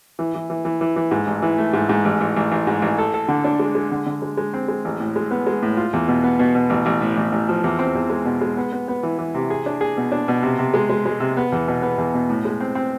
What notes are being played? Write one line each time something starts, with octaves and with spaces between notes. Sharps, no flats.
E3
E3
E3
E3
E3
E3
G#2
A1
E3
A3
G#2
G#2
A1
A1
A1
A1
G#2
A1
A4
A4
D3
D4
G#3
G#3
D3
D3
G#3
G#3
C4
G#3
A1
A2
G#3
B3
G#3
A2
F4
E2
B2
B3
B2
B2
A1
A1
A2
A1
A1
F3
E2
C4
E2
G#3
B2
G#3
B3
B3
B3
E3
E3
C3
G#4
D4
G#4
B2
D4
B2
C3
C3
G#3
G#3
G#3
C3
B3
E2
B2
B3
E2
B2
A2
G#3
C4
C4